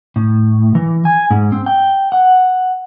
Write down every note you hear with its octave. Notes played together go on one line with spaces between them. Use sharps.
A2
E3
G#5
G#2
C4
G5
F#5